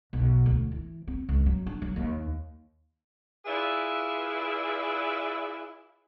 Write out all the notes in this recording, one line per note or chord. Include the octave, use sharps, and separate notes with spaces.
B1
D2
E3
C4
C#2
F#3
D4
F#3
D#2
E4 F4 G#4 B4 D5 E5